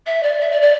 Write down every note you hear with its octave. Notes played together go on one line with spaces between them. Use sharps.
E5
D5
E5
D5
D5